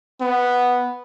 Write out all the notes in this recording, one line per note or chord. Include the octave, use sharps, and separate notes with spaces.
B3